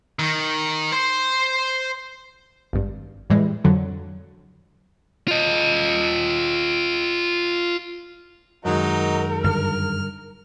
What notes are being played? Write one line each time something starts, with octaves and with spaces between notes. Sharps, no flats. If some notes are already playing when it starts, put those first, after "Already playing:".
D#3
C5 C6
G#1 G2
A2 E3 G3 G#3
F2 D3 F#3
F4 D#5
F#2 D#3 F#3 G#3 D#4 A#4
G2 D3 G3 F6